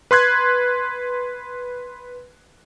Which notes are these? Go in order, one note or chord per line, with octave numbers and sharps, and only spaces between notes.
B4 C6 F#6 G#6